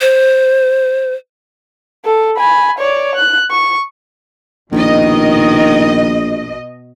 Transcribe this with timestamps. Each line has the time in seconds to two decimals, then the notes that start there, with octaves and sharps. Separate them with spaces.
0.01 C5
2.05 A4
2.37 G#5 B5
2.79 C#5 D5
3.16 F#6
3.51 C#6
4.72 A#1 B2 D#3 D#5